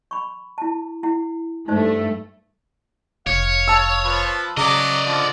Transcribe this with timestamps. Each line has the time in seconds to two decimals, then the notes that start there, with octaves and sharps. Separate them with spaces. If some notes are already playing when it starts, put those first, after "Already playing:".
0.11 B5 C#6
0.58 E4 A5
1.03 E4 F#5
1.68 G2 A3 D#4 C5
3.27 F1 C#5 F5
3.68 A5 E6
4.04 F3 B4
4.57 C#3 F#3 D5 D#5 A#5 D6
5.05 D3 F3